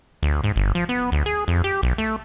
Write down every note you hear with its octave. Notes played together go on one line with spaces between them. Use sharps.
D2
G#2
G1
F3
B3
D2
G#4
F2
G4
B1
A3